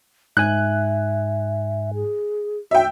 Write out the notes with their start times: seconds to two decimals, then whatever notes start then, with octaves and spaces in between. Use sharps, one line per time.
0.37 G#2 E5 G#5 F#6
1.94 G#4
2.71 F#4 E5 G5